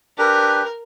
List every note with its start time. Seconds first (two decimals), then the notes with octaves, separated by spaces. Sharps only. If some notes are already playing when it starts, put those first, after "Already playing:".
0.18 D4 G4 A#4 B4